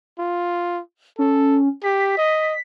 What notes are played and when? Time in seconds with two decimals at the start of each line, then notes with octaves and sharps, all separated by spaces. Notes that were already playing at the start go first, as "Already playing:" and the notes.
0.19 F4
1.19 C#4 A4
1.84 G4 B6
2.18 D#5